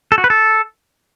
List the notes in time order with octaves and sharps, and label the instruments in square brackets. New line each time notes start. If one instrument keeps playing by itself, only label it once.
[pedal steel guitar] A4
F#4
B4
A4